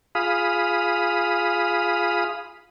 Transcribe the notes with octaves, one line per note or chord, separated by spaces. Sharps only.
F4 G#4 F5 B5 D#6